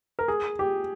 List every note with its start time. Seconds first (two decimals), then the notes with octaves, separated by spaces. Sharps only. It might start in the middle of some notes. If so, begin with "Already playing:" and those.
0.19 A#4
0.28 G#4
0.59 G4